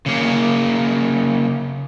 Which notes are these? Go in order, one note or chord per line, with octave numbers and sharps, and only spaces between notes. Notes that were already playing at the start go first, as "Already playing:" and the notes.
C#3 A#3